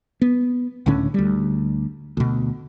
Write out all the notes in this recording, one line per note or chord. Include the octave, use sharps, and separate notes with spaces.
B3
C#2 A2 D3 C#4
D2 G3
D2 B2